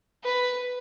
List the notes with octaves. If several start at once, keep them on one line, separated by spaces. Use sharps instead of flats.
B4